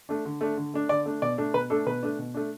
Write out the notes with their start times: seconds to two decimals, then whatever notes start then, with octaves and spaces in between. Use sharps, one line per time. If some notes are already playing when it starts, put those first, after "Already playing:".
0.09 A3 D4
0.25 D3
0.41 A3 D4
0.57 D3
0.74 A3 D4
0.89 D3 D5
1.06 A3 D4
1.22 B2 D5
1.38 A3 D4
1.54 B2 B4
1.70 A3 D4 A4
1.86 B2 B4
2.03 A3 D4
2.19 B2
2.34 A3 D4